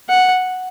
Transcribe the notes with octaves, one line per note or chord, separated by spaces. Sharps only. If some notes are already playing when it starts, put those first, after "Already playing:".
F#5